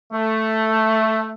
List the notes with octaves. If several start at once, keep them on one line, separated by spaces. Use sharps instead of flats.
A3